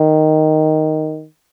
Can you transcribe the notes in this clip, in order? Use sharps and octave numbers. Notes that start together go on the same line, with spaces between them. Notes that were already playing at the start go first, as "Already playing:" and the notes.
Already playing: D#3